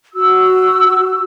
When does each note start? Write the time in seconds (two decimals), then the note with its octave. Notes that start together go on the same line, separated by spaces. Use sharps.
0.14 F#4 E6